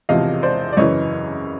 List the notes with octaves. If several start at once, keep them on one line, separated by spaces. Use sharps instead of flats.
E1 E2 C3 F3 D#5 F5
C5 D5
D5
F#2 C#3 E3 C#5 D#5